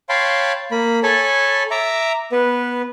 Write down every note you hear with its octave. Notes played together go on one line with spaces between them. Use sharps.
C#5 F5 G5 A5 B5 C6
A#3 B5
A4 C#5 G#5 A5 B5
E5 A#5 D6
B3 B4